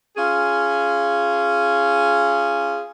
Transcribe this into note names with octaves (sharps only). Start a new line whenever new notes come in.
C#4 F4 G#4